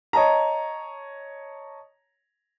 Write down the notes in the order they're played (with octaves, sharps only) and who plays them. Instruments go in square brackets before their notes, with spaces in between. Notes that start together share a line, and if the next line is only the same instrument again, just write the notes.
[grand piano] C#5 D#5 A5 A#5